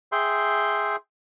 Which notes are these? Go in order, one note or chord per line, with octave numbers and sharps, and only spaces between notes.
G#4 E5 G5 C6